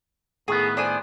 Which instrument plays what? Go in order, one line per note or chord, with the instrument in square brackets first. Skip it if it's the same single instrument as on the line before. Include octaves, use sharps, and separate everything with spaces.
[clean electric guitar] A2 D#3 B3 [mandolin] G#4
[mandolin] D4 C5 G#5